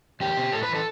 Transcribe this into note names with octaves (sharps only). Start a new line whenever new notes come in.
E2 G4
B2
A2 A4
B4
E3
A4